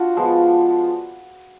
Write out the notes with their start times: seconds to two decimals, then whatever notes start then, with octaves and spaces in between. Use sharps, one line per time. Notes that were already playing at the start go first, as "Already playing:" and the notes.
Already playing: D4 F4 F#4
0.17 F3 G#3 B3